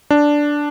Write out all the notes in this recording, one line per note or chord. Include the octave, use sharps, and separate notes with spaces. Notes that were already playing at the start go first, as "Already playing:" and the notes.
D4